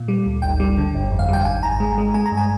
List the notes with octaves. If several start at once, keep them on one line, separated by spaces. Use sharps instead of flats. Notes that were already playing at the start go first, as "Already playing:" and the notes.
Already playing: A#2
G3
D2
G#1 G5
G3
D3
G1
F2
F5
G3 G5
G#1 G#5
G#1 A#5
G#3
G#3
G#3 G#5
A#5
G2
G#5